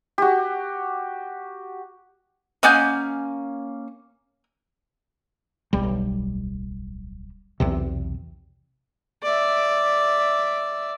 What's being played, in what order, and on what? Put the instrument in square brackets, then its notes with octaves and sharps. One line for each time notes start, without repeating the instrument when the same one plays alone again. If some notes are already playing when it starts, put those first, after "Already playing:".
[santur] F#4 G4
[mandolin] A#3 C#4 G6 [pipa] D#5 F#5 G#5
[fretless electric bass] D1 B1 G3
B1 E2 C3
[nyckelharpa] D5 E5